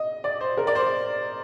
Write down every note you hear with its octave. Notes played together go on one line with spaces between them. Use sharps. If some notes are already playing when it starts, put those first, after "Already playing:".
Already playing: D#5
D5
C5
A#4
D5
C5